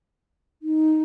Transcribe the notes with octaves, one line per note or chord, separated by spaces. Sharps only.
D#4